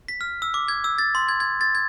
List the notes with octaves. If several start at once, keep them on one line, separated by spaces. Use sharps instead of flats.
B6
F6
E6
D6
G#6
E6
A6
C6
G#6
G#6
A6
G#6